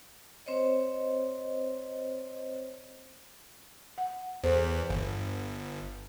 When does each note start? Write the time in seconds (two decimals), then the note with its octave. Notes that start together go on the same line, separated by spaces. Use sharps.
0.46 C4 C5 C#5 D#5
3.98 F#5
4.44 E2 A4 C5
4.90 G1